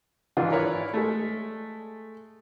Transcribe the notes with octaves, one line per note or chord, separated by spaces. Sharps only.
G#2 D#3 E3 D4 D#4 F4
E4 A#4 B4 C#5 D5
G#3 A3